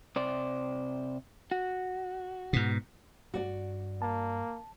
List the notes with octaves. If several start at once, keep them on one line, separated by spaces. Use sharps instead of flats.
C3 C5 D5
F#4
G#2 B2
G2 F#4 D5
A#3 A5